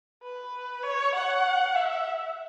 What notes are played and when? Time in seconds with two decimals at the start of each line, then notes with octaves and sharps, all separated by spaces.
0.23 B4
0.83 C#5
1.15 F#5
1.75 E5